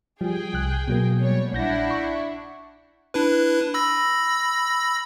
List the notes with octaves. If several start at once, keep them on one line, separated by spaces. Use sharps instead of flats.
F3 G3 G#4 G5
C2 F#6
B2 F#3 A#3
G3 C#5
A#1 D4 E4 F#5 G6 A#6
C#6
D4 E4 B4
B5 E6 A#6